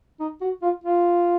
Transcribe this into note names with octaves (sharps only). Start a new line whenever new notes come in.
D#4
F#4
F4
F4